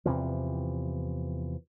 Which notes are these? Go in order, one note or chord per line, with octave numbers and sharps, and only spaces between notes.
E2 C3 E3 F3